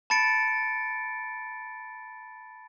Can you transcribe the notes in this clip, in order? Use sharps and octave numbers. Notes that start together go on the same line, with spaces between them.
A5 B5 A6 C#7 D7